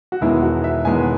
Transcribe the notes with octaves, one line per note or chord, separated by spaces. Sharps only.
F#4
E1 E2 D#3 G#3 B3 E4
F#4
E5
E1 E2 D#3 G#3 B3 G#5